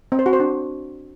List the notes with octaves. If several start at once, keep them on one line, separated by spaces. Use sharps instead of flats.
C4
C5
F#4
C5
D4